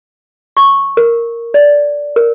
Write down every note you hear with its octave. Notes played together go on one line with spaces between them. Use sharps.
C#6
A#4
D5
A#4